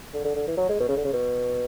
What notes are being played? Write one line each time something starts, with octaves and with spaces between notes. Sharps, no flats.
D3
D3
D3
E3
F#3
G#3
B2
C#3
D3
C#3
B2